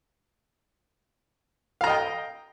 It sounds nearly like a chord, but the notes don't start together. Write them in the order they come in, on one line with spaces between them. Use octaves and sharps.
F5 A#5 D#5 G5